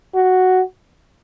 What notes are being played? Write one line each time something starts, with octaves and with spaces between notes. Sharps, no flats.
F#4